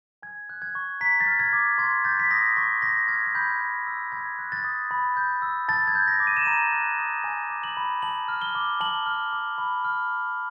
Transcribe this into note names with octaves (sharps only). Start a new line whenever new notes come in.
G#5 G#6
F#6
G#6
C#6
A#5 B6
A6
F6
G#6
D6
C6 G#6
G6 A6
B6
D#6 A#6
C#6 A#6
C#6 A#6
F6 G#6
G#6
B5 G6
G6
E6
B5 G#6
F#6
A6
D#6
B5
G6
E6
A5 A6
G#6
G6
A#6
D6
D#7
E7
A#5 D#7
F#6
D#6
G#5
D6
F#7
B5
A5 F#7
F6
G7
D6
A5 F#7
F6
D6
B5
F6
D6